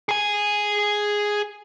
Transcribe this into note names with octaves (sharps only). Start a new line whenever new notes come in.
G#4 G#5